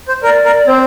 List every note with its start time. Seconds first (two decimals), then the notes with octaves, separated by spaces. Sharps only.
0.08 C5
0.22 A#4 D5
0.45 A#4
0.67 C4 C5